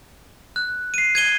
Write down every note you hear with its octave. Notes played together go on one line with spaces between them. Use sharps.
F#6
C7 D#7
G#6 D#7 G7